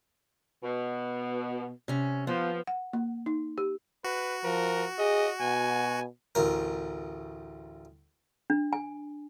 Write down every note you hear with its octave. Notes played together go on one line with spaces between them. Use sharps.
B2
C3 C#4
F3 B3
F#5
A#3
D#4
G4
F#4 B4
F3 A#4
G#4 D#5
B2 G#5
A1 D2 A#4
D4
G#5